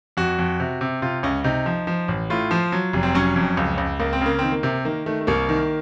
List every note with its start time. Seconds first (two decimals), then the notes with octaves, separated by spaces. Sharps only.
0.17 F2 F#4
0.39 F2
0.60 C3
0.81 C3
1.02 C3 F4
1.23 C#2 C#4
1.44 C3 D#4
1.66 F3
1.87 F3
2.08 A1
2.30 A2 F4
2.51 F3
2.72 F#3
2.93 F1
3.03 C4
3.15 F#3 C#4
3.36 F2
3.57 C#2
3.78 C#2
3.99 C#2 A#3
4.13 C4
4.21 C#3 A#3
4.39 D#3 C4
4.52 A#3
4.63 C3
4.85 D#3 A#3
5.06 D#3 A3
5.21 A3
5.27 C2 A#3
5.49 D#3